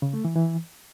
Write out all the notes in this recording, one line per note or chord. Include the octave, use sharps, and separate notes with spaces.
C#3
A3
E3
E3